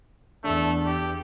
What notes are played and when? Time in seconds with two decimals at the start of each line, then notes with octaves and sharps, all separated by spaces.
0.44 E2 A3 D4
0.86 G4